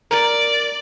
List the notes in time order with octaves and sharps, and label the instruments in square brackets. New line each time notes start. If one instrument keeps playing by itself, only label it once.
[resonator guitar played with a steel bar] A#4 [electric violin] D5